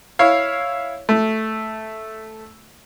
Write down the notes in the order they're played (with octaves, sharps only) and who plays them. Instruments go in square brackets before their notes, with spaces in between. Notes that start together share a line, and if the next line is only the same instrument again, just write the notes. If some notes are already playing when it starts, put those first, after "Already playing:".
[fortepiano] E4 C#5 F5
A3